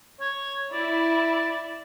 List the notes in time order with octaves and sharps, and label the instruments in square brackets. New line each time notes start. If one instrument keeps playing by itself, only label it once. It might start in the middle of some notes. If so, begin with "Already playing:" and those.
[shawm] C#5
[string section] E4 [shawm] D5